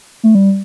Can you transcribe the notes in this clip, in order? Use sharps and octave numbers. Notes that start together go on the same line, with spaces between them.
A3
G3